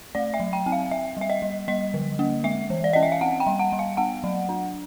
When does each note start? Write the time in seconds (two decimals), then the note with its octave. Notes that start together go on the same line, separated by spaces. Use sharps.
0.15 A3 D5
0.34 E5
0.40 F#3
0.53 G5
0.66 C4
0.72 F5
0.91 C4 E5
1.17 G3 E5
1.30 D#5
1.42 G3
1.68 G3 D#5
1.94 D3
2.19 A#3
2.44 G#3 E5
2.70 E3
2.84 D5
2.93 C#4 D#5
3.03 E5
3.12 F5
3.21 C4 F#5
3.40 G5
3.47 G3
3.59 F#5
3.72 G3
3.79 F5
3.97 B3 F#5
4.24 F#3
4.49 D4